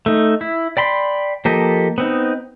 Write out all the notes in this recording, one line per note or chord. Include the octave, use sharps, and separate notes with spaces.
A3 D#4
E4
D5 G5 B5 C6
F3 A#3 G4 A4 D#5
B3 C4 D#4